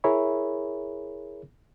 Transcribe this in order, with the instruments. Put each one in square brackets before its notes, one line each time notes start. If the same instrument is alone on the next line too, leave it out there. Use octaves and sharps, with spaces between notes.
[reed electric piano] E4 G#4 A#4 C#5 E5 B5